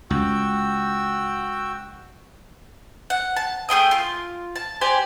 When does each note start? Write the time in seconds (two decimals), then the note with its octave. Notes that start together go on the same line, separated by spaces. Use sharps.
0.11 C#2 F#4 G5 E6
3.10 F#5
3.36 A5
3.69 A3 G#4 G5 D#6
3.91 F4
4.56 A5
4.81 G4 C5 D5 G#5